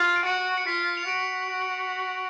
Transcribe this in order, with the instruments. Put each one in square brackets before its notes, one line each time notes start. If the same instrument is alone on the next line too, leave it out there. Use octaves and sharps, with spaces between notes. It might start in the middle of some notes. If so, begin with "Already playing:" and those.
Already playing: [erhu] F4
[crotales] D7
[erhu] F#4 [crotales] C#7
[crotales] C#7
[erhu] F4 [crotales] B6
[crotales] F7
[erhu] F#4 [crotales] D7